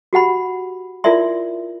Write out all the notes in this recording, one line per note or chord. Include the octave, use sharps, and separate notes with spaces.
F#4 G4 F#5 B5
E4 F4 A#4 D5 E5 C6